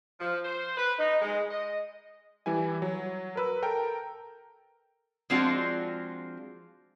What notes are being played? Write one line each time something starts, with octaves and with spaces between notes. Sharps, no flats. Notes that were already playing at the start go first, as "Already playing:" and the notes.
F3
C5
B4
D#4
G#3
D#5
E3 G3 E4 G#5
F#3
A#4 B4 E6
A4 A#4 G5
F3 G#3 C4 D4 F4 F#4